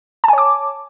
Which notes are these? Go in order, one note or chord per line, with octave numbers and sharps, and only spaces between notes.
C#5 G#5 A5 D6